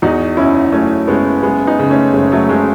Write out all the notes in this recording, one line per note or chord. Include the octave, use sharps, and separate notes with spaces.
E2 D#4 F#4
F#1 C#4 E4
F#3 A3 C#4
F#1 G#3 B3
F#1 G#3 B3
B3 D#4
C#3
A3 C#4
F#1 G#3
F#3 A3
F#1 G#3